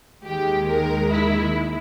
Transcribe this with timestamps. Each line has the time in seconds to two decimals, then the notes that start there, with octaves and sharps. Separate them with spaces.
0.24 D#2 D#3 G#3 G4
0.67 A#4
1.09 E4